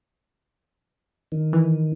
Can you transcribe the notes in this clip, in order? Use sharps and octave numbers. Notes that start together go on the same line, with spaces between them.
D#3
E3